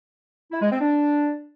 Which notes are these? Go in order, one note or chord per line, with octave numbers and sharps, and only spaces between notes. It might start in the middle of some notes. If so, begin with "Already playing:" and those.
E4
G#3
C4
D4